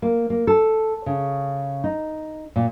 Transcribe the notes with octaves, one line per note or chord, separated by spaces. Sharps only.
A#3
A#3
A4
C#3
D#4
A#2